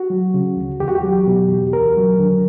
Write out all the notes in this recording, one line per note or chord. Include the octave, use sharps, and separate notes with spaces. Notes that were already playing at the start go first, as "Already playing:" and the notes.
Already playing: F#4
F#3
C#3
D2
E2 G4
F#4
G4
F#3
B2
E2
D2 A#4
F#3
D3